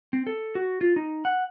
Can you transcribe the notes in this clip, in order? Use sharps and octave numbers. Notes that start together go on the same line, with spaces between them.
C4
A4
F#4
F4
D#4
F#5